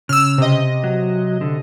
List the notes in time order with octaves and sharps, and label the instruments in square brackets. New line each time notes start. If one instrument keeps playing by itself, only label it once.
[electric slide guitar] C#3 [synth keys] E6 F6
[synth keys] C3 D#5
[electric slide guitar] F#3
D3